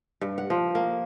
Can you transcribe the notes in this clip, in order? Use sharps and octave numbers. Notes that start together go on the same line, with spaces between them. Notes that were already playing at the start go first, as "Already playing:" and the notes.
G2
F#5
F3
A#3